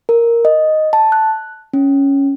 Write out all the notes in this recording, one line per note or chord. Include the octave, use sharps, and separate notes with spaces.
A#4
D#5
A5
F#6
C#4